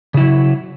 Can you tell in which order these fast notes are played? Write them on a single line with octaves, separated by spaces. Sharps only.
C#3 E4 F#3